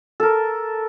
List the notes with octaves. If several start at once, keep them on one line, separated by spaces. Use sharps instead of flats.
A4 A#4